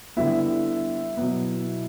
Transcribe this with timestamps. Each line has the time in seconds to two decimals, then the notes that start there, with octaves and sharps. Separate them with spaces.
0.17 D3 G3 B3 E4 E5
1.17 B2 F#3 B3